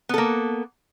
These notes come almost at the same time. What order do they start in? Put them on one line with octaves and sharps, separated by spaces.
B3 A4 A#3